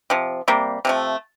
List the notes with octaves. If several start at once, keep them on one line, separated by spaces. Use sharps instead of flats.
C3 F3
C3 G3 A#3
C3 F3 A3